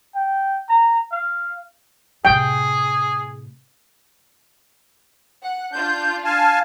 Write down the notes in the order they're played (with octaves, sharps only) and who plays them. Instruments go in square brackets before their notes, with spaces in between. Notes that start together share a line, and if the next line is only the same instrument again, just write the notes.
[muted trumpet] G5
A#5
F5
[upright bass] A2 C3 [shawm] G#4 [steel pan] G5
[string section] F#5
[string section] D4 F4 [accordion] G6
[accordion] F5 G#5 A5